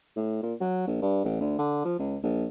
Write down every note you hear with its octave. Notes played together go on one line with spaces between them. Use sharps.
A2
A#2
F#3
A#1
G2
A1
D2
D3
F3
C#2
A#1